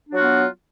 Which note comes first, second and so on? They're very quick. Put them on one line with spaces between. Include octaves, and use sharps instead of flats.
D4 F#3 F#4 F4 B3